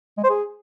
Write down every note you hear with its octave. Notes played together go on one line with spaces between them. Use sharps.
G#3
C5
G#4